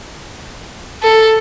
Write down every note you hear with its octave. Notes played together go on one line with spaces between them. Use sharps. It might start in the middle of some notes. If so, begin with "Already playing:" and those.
A4